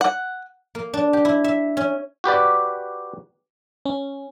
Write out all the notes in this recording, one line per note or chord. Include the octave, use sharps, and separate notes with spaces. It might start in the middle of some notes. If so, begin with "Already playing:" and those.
F#5
A#3
D4
G4
E4
E5
C#4
F#4 G4 B4 D5
C#4